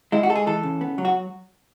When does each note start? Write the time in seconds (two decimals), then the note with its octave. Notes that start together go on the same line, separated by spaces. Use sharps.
0.12 G#3 E4
0.23 F#4
0.29 G#3 A4
0.36 G#4
0.47 E3 A4
0.63 C#3
0.81 B3
0.98 F#3
1.05 F#4